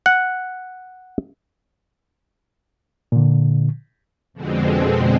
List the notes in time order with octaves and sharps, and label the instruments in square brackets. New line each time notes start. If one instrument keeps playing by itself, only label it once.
[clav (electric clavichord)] F#5
[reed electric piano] A#2 D3
[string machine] F2 B2 D3 G#3 C4